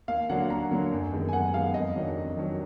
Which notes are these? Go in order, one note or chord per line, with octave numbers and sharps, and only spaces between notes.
D#2 F5
D3 F#3 A#3 D4 F#5
D#2 A#5
D3 F#3 A#3 D4
F#2
D#3 G#3 B3
G#5
F#2 F#5
D#3 G#3 B3 F5
F2 D#5
D#3 F#3 D4
F2
D#3 F#3 D4